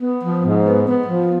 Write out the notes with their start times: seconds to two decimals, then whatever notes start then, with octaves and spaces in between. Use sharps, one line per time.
0.01 B3
0.22 F3
0.43 G#2
0.65 B3
0.86 B3
1.07 F3